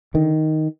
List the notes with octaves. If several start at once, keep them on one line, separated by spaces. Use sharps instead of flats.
D3 D#3